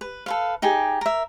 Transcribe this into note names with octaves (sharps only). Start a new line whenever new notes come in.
B4
A4 B4 F5
D#4 G4 G#4 G#5
A#4 E5